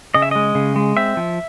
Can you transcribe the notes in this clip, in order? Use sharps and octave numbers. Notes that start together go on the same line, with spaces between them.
C#3 D#5
E5
G#3 D#5
C#3
G#3
C4 E5
F3